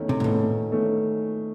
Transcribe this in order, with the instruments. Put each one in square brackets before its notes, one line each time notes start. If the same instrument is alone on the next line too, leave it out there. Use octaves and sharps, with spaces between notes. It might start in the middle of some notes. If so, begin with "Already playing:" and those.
Already playing: [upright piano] E2 D#3 A3 C#4
[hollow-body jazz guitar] C3
G#2
[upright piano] E2 D#3 A3 C#4 [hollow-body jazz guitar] A2
[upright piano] E2 D#3 A3 C#4